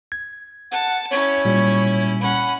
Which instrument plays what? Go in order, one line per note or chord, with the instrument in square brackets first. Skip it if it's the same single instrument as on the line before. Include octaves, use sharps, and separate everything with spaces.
[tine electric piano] G#6
[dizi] F#5 [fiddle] A5
[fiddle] C#4 E4 [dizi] C#5
[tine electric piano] A#2 G3
[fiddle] C#4 F#5 [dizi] B5